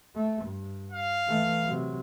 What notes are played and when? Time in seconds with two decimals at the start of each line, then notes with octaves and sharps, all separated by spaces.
0.15 A3
0.45 G2
0.91 F5
1.27 E3 A3
1.65 C3 F#3